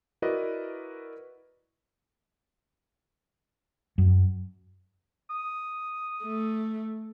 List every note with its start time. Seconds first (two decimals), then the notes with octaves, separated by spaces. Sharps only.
0.22 E4 F#4 A#4 B4 D5 D#5
3.98 F#2
5.30 D#6
6.23 A3